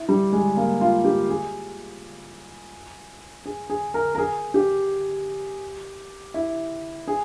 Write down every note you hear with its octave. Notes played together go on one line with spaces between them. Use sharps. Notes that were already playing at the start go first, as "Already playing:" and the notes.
Already playing: E4
G3
G#3
A#3
F4
G4
G#4
G#4
G#4
A#4
A#4
G#4
G4
E4
G#4